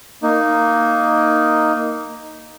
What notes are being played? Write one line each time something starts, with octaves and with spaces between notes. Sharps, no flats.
A#3 D#4